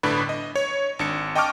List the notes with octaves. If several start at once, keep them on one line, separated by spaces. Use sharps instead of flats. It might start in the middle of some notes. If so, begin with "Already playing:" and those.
G1 A2 D3 D4 B4 B5
D#5
C#5
G#1 D4 C#7
D#5 G5 A5 C#6 D6 F6